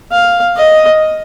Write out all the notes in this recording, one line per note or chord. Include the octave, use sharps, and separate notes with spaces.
F5
D#5